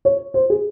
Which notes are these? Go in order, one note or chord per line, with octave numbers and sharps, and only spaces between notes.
C#5
C5
G#4